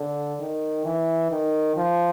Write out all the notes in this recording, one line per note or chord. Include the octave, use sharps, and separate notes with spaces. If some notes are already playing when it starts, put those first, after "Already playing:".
Already playing: D3
D#3
E3
D#3
F3